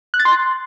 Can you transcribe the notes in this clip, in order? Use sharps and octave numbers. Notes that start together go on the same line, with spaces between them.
F#6
A6
C6